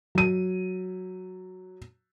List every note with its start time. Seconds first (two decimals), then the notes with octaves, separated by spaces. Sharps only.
0.15 F#3 D#7